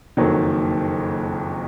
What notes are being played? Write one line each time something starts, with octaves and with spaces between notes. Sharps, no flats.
F#1 F2 D#3 F#3 A#3